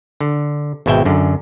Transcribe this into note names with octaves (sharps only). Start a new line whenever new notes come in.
D3
G#1 B2 G#3 E5 G5
F#2 D3